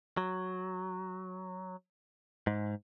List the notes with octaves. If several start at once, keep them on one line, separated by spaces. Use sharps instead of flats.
F#3
G#2